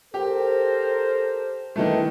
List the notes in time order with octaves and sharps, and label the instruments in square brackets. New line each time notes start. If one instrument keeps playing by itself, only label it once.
[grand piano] G4 [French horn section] A4 A#4 C5
[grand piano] D#3 E3 A3